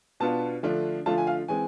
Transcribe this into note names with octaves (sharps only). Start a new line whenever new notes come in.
B2 B3 D4 F4 A5
D3 F3 A3 D4 F4
D3 F3 A3 D4 F4 A5
G#5
F5
E3 G#3 C4 G#5